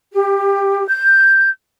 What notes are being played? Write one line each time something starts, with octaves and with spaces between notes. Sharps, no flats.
G4
G6